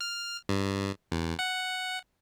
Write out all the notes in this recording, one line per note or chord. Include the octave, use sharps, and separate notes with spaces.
F6
G2
E2
F#5